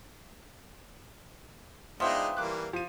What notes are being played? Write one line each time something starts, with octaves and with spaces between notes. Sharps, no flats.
G#3 B3 D4 D#4 F4 C5 E5 G5
E3 G3 A#3 D6 F#6
F3 D#7